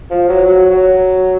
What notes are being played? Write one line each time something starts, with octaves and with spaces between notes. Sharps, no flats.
F3
F#3
F#3
F#3